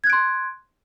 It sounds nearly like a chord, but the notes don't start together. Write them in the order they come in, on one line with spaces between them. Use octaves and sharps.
G#6 F#6 D7 C6